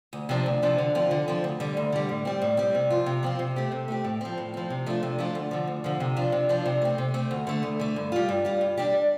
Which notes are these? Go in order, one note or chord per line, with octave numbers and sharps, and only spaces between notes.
D2
C3 F3 D4
D2
C3 F3 D4
D3
F3 C4 F4
D3
F3 C4 F4
D2
D3 G3
D2
D3 G3
A2
G3 C4
A2
G3 C4
C3
F3 C4 F4
C3
F3 C4 F4
C3
A3 C4 G4
C3
A3 C4 G4
A2
F3 C4
A2
F3 C4
C3
F3 A3 D4 F4
C3
F3 A3 D4 F4
D2
D3 F3
D2
D3 F3
C3
F3 D4 F4
C3
F3 D4 F4
C3
A3 C4
C3
A3 C4
D2
D3 A3
D2
D3 A3
G2
G3 F4
G2
G3 F4
G2
G3 D4 G4